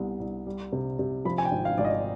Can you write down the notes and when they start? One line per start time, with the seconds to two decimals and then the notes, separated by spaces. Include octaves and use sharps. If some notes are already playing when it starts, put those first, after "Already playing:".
Already playing: C2 B3
0.20 C2
0.46 G3
0.73 C3
0.99 C3
1.25 F3 B5
1.38 G#5
1.45 G5
1.52 G#1
1.65 F5
1.78 G#1 D5
1.84 D#5